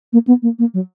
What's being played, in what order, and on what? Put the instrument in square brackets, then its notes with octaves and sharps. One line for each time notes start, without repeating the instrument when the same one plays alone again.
[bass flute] A#3
B3
A#3
A#3
F#3